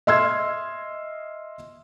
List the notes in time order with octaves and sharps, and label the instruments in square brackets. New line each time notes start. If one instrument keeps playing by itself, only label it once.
[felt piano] D#5 E5 C6 E6 F6 G#6